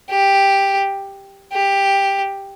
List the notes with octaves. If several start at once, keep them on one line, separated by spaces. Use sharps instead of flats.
G4
G4